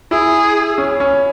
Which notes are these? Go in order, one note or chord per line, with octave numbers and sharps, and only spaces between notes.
E4 G#4
C#4
C#4